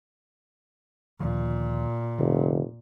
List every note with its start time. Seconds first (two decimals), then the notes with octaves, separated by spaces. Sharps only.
1.20 D2 A#2 D#3 F3
2.19 F1 D3